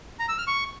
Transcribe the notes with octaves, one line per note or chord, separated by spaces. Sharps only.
A#5
E6
F6
C#6